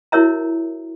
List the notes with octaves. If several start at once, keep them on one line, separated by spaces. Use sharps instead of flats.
E4 F#4 A#4 C#5 E5 A#5